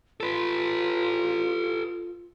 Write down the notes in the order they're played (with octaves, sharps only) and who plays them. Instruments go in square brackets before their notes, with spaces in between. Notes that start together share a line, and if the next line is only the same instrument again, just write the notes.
[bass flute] F4 [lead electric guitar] A4 B4